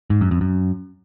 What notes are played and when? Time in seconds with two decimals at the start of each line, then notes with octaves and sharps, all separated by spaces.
0.10 G#2
0.21 F#2
0.31 F2
0.41 F#2